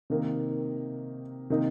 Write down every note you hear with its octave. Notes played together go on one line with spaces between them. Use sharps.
C3 D#3 A#3
C3 D#3 A#3 D#4